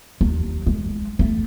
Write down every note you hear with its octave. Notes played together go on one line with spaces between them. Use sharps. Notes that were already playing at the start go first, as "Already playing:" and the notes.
D#2
G#3
A3